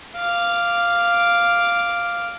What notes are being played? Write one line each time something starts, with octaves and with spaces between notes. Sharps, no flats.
F5 D6